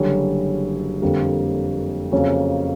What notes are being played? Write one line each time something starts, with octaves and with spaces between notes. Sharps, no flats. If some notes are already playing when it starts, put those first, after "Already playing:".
Already playing: F#1 F#2 D3 G3
F2 D3 G3 A#3
F2 C#3 F#3 A#3 C#4